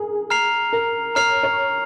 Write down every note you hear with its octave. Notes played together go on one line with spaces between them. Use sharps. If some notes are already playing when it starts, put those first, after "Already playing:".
Already playing: G#4 A#4
A#5 F6 C7 F7
A#4
C#5 A#5 F6 C7 F7
C#5